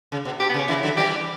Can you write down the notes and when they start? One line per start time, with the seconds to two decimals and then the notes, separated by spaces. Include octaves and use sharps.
0.12 C#3
0.25 B2
0.40 B2 G4
0.49 B3
0.54 C#3
0.59 C#4
0.68 C#3 E3 E4
0.83 D3 F#3
0.97 E3 G3 G4